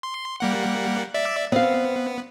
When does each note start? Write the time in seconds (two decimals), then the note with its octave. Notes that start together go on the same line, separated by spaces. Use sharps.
0.03 C6
0.40 G3 A#3 F#5
1.14 D5 E5
1.52 B3 C4 F5